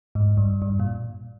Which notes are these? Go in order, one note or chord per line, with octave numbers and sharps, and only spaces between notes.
G#2
G2
G2
A#2